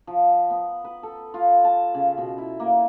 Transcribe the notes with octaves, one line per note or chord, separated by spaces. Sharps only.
F3
B3
B4
A4
F4
A5
C#3
B2
E4
A#3